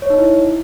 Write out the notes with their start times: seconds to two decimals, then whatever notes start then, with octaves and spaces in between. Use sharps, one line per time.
0.02 C#5
0.10 D#4
0.18 E4